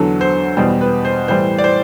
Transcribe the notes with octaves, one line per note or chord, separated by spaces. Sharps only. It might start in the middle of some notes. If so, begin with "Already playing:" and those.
Already playing: E2 D3 F#3 A4
C5
E2 B2 G3 C5
B4
C5
A2 E3 G3 C5
D5
C5